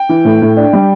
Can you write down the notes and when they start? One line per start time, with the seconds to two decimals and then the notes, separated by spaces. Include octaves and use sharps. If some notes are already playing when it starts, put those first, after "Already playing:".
Already playing: G5
0.09 E3
0.25 A2
0.42 A2
0.57 D4
0.73 G3